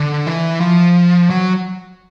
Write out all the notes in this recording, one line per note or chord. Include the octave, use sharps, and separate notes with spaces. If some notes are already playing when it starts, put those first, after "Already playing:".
Already playing: D3
E3
F3
F#3